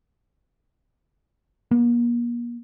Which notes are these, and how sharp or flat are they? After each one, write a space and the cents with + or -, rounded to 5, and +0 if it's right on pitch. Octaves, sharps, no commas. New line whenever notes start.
A#3 +40